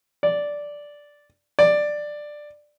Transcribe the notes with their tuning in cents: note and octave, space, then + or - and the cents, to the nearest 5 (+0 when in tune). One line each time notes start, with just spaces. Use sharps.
D5 -5
D5 +10